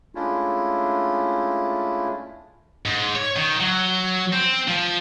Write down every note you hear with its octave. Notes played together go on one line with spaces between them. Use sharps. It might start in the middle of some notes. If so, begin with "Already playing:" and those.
G#3 A3 C#4 D4 E4 F4
G#2
C#5
D#3
F#3
C4
F3